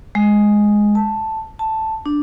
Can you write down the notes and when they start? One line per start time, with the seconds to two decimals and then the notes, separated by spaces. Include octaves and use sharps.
0.15 G#3
0.95 A5
1.59 A5
2.06 D4